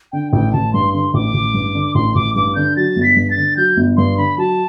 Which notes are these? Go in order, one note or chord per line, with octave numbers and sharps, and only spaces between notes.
D3 G5
A1 G5
A1 A5
G2 C6
D3 C6
A1 D6
A1
G2
D3
A1 C6
A1 D6
G2 D6
D3 G6
F#3 A6
G1
B6
G2
A6
D3
F#3 G6
G1
G2 C6
D3 B5
F#3 A5